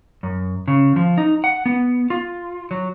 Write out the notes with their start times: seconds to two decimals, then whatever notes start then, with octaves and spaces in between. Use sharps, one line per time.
0.23 F#2
0.68 C#3
0.96 F3
1.18 D#4
1.44 F#5
1.66 B3
2.10 F4
2.71 F#3